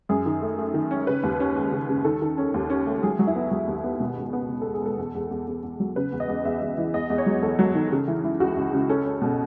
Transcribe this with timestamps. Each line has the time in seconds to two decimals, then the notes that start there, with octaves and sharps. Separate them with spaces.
0.09 F#2 G#4
0.26 D#3
0.42 A3
0.59 A3
0.74 D#3
0.91 C#4
1.07 C#3 B4
1.23 D#2
1.40 C#4
1.56 G#3
1.72 C#3
1.89 C#3
2.04 D#3 A4
2.22 D#3
2.38 C#4
2.54 D#2
2.70 C#4
2.87 A3
3.03 F#3 G#4
3.19 F#3
3.27 E4
3.36 B3
3.51 F#3 G#4
3.67 D#2
3.84 B3
4.00 B2
4.16 C#2
4.33 B3
4.50 B2
4.62 A4
4.66 G#3
4.74 G#4
4.82 G#3 A4
4.98 E2
5.15 E2
5.31 E2
5.47 E2
5.63 E2
5.80 F#3
5.96 C#3 B4
6.12 E2
6.20 D#5
6.28 E2
6.45 E2 E5
6.61 E2 D#5
6.78 E3
6.94 E2 D#5
7.10 E2
7.18 C#5
7.26 F#3
7.42 E2 A4
7.59 F#3
7.75 D#3
7.92 C#3
8.08 E3
8.24 E3
8.40 C#2 F#4
8.57 C#2
8.73 C#3
8.89 C#4 A4
9.06 C#4
9.21 B2